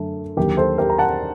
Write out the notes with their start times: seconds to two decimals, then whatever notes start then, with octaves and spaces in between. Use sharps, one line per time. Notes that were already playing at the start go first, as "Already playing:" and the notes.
Already playing: F#2 D3 A3
0.37 D#2 D3 F#3 G4 A#4
0.57 A4 C5
0.78 G4 A#4
0.90 A#5
0.98 F#5 A5